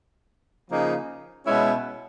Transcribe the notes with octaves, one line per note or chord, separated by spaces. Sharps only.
C#3 F3 A#3 D#4
B2 G#3 C#4 E4